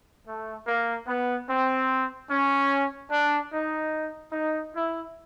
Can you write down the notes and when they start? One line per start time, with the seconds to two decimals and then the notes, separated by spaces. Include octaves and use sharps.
0.27 A3
0.67 A#3
1.08 B3
1.49 C4
2.30 C#4
3.11 D4
3.52 D#4
4.33 D#4
4.74 E4